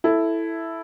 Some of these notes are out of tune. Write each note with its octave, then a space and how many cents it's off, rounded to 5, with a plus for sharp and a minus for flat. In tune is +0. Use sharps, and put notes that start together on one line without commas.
E4 +0 A4 +0